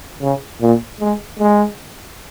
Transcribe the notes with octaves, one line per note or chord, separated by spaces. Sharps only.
C#3
A#2
G#3
G#3